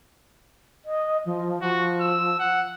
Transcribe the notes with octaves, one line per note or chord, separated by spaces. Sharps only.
D#5
F3
F3 F#4
E6
F#5